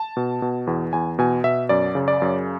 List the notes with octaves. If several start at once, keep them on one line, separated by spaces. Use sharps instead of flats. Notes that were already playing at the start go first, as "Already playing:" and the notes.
Already playing: A5
B2
B2
E2
E2 G#5
B2 G#5
B2 E5
F#2 D5
C#3
D5
F#2